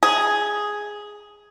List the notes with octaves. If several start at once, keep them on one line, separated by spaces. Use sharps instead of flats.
G#4